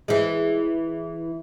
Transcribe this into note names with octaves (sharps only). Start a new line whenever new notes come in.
E3 G#3